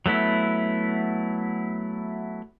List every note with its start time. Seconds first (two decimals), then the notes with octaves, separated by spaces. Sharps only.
0.06 F#3 A3 B3 E4